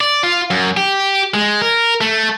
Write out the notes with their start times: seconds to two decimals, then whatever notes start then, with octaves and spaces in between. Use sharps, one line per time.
0.01 D5
0.23 F4
0.51 F#2
0.77 G4
1.34 G#3
1.62 A#4
2.01 A3